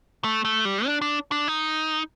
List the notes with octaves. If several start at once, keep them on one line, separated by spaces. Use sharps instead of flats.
A3
A3
G3
D4
D4
D4
D#4